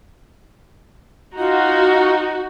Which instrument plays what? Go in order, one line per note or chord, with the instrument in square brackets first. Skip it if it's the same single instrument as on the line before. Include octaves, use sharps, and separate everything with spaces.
[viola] D#4 [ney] F4 [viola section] F#4